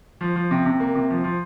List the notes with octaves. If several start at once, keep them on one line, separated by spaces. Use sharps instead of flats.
F3
F3
C3
C3
A#3
C3
F3
F3